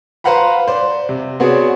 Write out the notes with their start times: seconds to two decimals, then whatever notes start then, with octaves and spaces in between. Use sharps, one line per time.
0.24 B4 C5 F5 F#5 A#5 B5
0.68 C5 D5
1.09 C3
1.40 B3 C4 F#4 G#4 C#5 D5